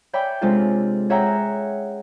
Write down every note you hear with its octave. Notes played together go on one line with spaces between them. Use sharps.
C#5 D5 E5 G5 G#5 B5
C3 G#3 C#4 D4 F4 A4
G#4 C#5 E5 F#5 G5 A#5